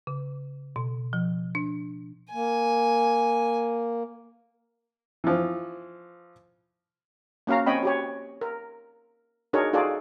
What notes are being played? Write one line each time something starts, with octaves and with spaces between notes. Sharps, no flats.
C#3
B2
F3
D4
A#3 G#5
E3 F3
A#3 C#4 F#4 F5 A#5
C4 C#4 C#5 D#5 G5 B5
F#4 G4 C#5
A#4
D4 D#4 F#4 G#4 A#4 C#5
D#4 F4 F#4 G#4 A4 D5